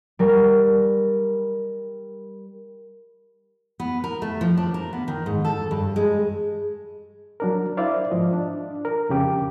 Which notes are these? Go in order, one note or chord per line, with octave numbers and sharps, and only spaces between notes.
G3 A#4
B3
A#4
A3
F3
D4
A#4
B3
D#3
G#2
A4
G2
G#3
F#3 D4 A#4
E4 C5 D5 E5 F5
G#2 F3 D#5
D4
A#4
F2 C#3 G4 D6